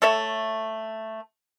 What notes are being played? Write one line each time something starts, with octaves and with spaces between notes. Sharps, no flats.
A3 A4 C#5 E5